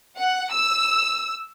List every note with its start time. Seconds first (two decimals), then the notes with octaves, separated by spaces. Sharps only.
0.18 F#5
0.52 E6